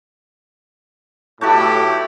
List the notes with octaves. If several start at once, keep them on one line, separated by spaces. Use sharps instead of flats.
B1 A2 A3 E4 F#4 G4 A4